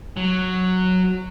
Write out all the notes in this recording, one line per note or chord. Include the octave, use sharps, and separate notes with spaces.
F#3